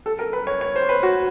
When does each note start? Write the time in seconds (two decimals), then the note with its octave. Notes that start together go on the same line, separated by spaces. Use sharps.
0.06 A4
0.19 A#4
0.33 B4
0.47 C#5
0.61 C#5
0.76 C5
0.89 B4
1.03 F#4